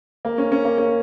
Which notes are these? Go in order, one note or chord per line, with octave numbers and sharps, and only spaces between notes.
A#3
C#4
C#4
A#3
C#4